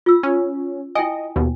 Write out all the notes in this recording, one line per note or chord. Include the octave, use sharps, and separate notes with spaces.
F4 E6
C#4
E4 D#5 G5 G#5
D#2 B2